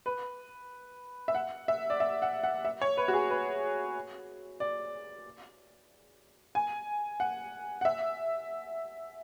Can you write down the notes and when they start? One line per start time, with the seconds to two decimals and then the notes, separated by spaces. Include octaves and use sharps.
0.06 B4
1.28 E5
1.35 F#5
1.68 E5
1.90 D5
2.00 E5
2.22 F#5
2.43 F#5
2.65 E5
2.82 C#5
2.97 B4
3.08 F#4
3.13 G#4
3.30 B4
4.60 D5
6.55 G#5
7.20 F#5
7.81 F#5
7.85 E5